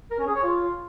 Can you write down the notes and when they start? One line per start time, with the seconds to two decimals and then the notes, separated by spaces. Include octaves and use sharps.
0.11 A#4
0.19 C#4
0.27 G#4
0.35 C#5
0.43 F4